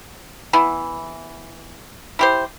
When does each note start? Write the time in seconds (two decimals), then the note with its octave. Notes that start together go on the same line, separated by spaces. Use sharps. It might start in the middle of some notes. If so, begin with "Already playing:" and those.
0.53 E3 B3 E4
2.19 E4 G4 C5